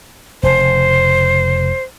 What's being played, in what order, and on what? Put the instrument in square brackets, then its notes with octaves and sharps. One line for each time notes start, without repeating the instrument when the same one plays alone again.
[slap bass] F1 C#3 [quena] C5